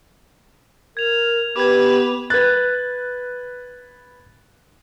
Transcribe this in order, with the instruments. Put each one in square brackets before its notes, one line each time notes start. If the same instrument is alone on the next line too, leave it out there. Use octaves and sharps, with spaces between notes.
[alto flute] A#4 [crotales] G#6 F7
[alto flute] B3 [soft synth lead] G4 [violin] B4 [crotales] D6 G#6
[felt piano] B4 F#6 [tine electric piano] G#6 A6